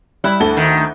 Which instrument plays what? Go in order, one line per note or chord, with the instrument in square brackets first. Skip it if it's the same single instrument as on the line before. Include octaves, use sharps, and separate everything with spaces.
[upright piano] G3 F#6 [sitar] E4
[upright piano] D2 A4 G7
[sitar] D#3